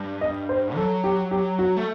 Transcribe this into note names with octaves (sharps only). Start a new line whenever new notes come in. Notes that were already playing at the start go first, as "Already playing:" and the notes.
Already playing: G2
D#5
C5
F#3 A4
G4
G4
F#4
A3